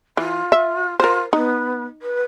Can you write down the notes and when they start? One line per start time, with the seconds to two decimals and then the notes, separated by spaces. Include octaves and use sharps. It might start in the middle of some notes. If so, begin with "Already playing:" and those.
0.17 E3 F4
0.52 E5
1.00 F4 A#4 C5
1.33 B3 D#4
2.02 B4